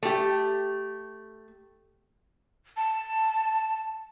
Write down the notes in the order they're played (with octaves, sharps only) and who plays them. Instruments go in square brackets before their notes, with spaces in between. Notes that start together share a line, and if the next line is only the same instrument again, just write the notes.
[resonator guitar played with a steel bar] A3 G4
[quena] A5